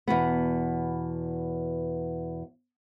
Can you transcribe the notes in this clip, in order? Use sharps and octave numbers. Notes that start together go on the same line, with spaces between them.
E2 B2 B3